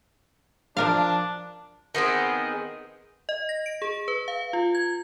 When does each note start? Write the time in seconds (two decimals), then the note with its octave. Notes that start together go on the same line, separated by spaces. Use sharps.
0.77 F3 D4 A#4 F5
1.95 D#3 B3 C4 G#4
3.29 D#5
3.49 A#6
3.66 D7
3.82 G#4
4.08 B4
4.28 F5
4.53 F4
4.75 G#6